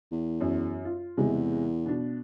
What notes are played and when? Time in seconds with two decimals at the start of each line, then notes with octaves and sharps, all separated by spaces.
0.11 E2
0.41 F#2
0.85 F4
1.17 E2 C3 G#3
1.86 B2 D4